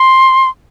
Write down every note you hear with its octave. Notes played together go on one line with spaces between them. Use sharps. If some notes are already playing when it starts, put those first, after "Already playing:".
Already playing: C6